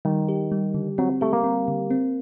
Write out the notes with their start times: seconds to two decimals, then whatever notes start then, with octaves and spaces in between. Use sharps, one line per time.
0.05 D#3 G3
0.29 G4
0.52 G3
0.74 D3
0.98 F#3 C4
1.21 A3 G4
1.33 A#3
1.44 C4
1.68 D3
1.91 C4